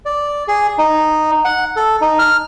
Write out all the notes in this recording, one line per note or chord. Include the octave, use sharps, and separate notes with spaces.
D5
G#4
D#4
F#5
A4
D#4
F6